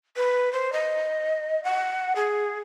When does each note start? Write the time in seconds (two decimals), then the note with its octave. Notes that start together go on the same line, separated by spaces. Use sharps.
0.17 B4
0.53 C5
0.73 D#5
1.64 F#5
2.16 G#4